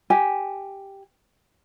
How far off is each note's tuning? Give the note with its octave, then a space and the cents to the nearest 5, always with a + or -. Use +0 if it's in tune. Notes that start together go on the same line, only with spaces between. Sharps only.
G4 +0 G#5 +0